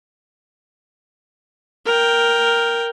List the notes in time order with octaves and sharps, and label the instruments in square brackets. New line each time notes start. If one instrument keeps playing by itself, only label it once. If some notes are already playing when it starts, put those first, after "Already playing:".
[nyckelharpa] A#4 G5